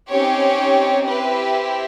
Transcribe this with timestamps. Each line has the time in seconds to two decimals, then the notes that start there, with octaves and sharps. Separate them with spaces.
0.10 C4 C#4 D#4 G4 C#5
1.09 C4 E4 G4 B4